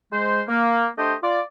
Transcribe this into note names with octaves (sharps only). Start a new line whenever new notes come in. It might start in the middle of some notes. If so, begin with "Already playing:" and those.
G#3 C5
A#3
A3 D4 G4 C5 D#5
F4 D5